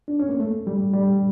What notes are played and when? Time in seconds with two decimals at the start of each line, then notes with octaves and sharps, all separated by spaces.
0.08 D4
0.20 C#4
0.29 A#3
0.39 A3
0.67 G3
0.93 G3